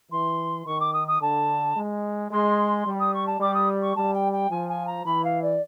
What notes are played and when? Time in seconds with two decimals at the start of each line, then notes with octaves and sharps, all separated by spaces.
0.11 E3 C6
0.66 D#3 C#6
0.80 D6
0.93 D#6
1.08 D#6
1.21 D3 A5
1.76 G#3
2.31 G#3 C6
2.86 G3
3.00 D#6
3.14 C#6
3.26 A5
3.40 G3 D6
3.54 D#6
3.82 C#6
3.96 G3 A5
4.14 G5
4.32 G5
4.50 F3 G#5
4.69 G#5
4.87 A#5
5.05 E3 B5
5.24 F5
5.42 D5